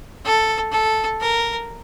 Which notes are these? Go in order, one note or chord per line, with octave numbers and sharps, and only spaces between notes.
A4
A4
A#4